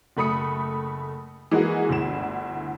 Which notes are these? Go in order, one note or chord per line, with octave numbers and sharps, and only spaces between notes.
F#1 A3 B5 D#6 C#7
E3 G#3 A#3 F#4 G#4
G1 D2 E4 E7